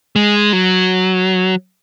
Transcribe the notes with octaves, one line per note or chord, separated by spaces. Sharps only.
G#3
F#3